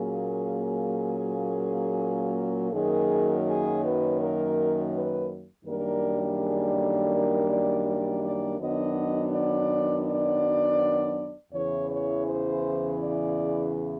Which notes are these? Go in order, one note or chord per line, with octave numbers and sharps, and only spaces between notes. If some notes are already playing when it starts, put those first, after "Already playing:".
Already playing: A#2 F#3 A#3 C#4 G#4
F#2 D#3 F#3 A#3 G#4
G#4
B4
A#4
B4
F#2 D#3 G3 A#3 D4 A#4
G#4
A4
A#4
D5
D5
D5
F#2 D#3 F#3 B3 D4 D#5
D5
D5
E2 C#3 E3 C#5
C#5
C5
D5